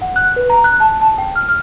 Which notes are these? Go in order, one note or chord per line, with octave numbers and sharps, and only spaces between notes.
F#5
F#6
B4
A#5
F#6
A5
A5
G5
F6
F6